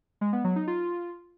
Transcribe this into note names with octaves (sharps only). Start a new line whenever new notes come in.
G#3
B3
F#3
D#4
F4